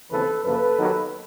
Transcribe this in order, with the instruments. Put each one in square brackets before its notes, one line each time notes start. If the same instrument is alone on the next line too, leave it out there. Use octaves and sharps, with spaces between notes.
[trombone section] D#2 C#3 E3 A3 C4 A4 B4
F#2 C#3 F3 A#3 A4 B4
D#2 D#3 F#3 B3